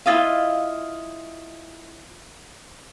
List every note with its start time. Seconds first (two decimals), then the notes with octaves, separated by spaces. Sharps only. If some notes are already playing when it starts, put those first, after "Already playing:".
0.06 E4 F4 D#5 F5